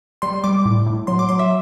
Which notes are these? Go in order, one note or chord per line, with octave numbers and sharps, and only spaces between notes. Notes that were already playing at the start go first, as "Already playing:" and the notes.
G3 C6
G3 D6
A2
A2
F#3 C6
D6
F#3 C6
E5